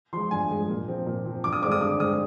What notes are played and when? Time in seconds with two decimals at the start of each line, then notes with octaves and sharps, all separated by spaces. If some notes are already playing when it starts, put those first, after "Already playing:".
0.13 F3 C6
0.16 G#3
0.31 G2 G#5
0.50 F3 G#3
0.68 A#2
0.88 F3 C4
1.06 A#2
1.25 F3 C4
1.44 G2 D6
1.53 D#6
1.62 D3 G#3 C4 D6
1.72 D#6
1.81 G2 D6
2.00 D3 G#3 C4 D#6